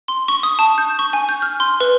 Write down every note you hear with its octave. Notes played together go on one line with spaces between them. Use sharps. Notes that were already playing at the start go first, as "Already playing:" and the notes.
C6
C#6
D#6
A5
G6
C#6
G#5
G6
F6
C6
B4